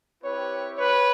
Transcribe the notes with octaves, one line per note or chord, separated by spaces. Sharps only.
C4 E4 G4 B4 C#5
B4 C#5